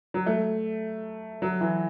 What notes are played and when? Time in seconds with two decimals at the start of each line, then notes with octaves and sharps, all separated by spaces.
0.14 F#3
0.26 A3
1.42 F#3
1.61 E3